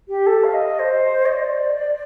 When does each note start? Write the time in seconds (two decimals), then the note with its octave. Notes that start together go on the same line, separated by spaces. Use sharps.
0.08 G4
0.26 A4
0.44 F5
0.53 D#5
0.79 C5
1.25 D#5
1.32 D5